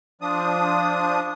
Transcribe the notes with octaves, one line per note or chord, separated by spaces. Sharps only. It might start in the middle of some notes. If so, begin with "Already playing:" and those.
F3 D4 D#6